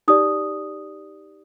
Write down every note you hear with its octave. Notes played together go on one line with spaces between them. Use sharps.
D#4 G4 D5 D#6